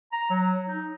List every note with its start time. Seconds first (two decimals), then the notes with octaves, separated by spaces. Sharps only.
0.12 A#5
0.30 F#3
0.67 D#4